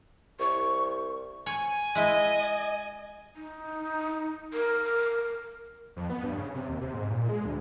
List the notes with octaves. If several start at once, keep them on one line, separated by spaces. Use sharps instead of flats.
C2 C#6
C#5 G#5
G#3 E4 D#5
D#4
A#4
F2
B3
G2
C#3
C3
D#2
C3
G#2
A#2
G#3
D2